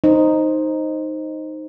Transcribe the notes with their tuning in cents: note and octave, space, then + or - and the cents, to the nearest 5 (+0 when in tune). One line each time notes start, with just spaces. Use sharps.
D#4 +0 C5 +5